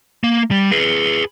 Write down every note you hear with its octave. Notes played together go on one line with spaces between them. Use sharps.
A#3
G3
G#4 B4